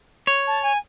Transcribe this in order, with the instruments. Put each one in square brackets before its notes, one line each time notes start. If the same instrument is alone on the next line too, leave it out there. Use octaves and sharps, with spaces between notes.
[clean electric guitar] C#5
[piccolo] A5
G#5